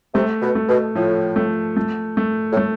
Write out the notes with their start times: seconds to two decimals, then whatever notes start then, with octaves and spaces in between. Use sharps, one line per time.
0.14 C3 A3
0.42 B2
0.55 A3
0.69 B2
0.95 A2 F3
1.36 A3
1.77 A3
2.17 A3
2.52 A2
2.57 A3